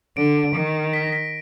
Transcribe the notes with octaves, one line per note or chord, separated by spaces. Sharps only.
D3 D7
D#3
B6
A#6
B6